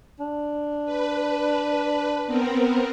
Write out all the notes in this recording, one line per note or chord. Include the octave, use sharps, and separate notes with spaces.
D4
B4
B3 C4 A#4